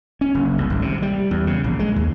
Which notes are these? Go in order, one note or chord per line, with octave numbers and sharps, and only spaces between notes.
C#4
F#1
C2
G#1
C3
G3
E2
C#3
A#1
G#3
D#2